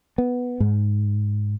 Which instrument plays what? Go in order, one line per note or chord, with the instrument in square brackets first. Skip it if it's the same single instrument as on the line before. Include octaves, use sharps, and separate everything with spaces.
[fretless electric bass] B3
G#2